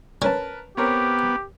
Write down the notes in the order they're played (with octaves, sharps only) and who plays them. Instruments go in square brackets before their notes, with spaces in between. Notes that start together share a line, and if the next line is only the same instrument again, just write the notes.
[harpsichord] C#4 [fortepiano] A#4 B4 A5
[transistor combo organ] B3 [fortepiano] C4 A#4 C#5 [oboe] G4